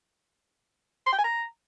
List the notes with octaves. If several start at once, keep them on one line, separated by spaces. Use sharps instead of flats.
C6
G5
G#5
A#5